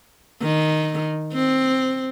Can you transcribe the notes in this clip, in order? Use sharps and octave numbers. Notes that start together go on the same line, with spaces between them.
D#3
C4